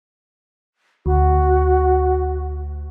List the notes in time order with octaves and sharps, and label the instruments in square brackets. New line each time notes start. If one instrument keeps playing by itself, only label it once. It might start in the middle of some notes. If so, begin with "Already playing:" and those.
[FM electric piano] D2 [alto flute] F#4